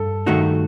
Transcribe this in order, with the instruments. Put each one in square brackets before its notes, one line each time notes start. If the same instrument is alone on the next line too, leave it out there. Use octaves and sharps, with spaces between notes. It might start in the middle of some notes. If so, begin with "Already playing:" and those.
Already playing: [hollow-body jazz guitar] G2 [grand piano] A4
[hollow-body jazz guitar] G2 D#3 A3 D#4 F#4